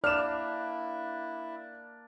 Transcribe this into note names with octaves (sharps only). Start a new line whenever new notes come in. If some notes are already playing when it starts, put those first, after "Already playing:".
A#3 D4 E4 D5 F6 E7